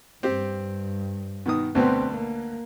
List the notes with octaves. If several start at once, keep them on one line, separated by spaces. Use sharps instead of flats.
G2 C4 G4
B2 D#3 D#6
D2 B2 B3 C4
A#3